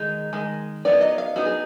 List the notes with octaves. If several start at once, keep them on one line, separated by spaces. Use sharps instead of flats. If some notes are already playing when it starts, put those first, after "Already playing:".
Already playing: D#3 G#3 D#4
D#3 G#3
F#3 B3 D#4 D5
D#5
F5
F#3 B3 D#4 F#4
G#4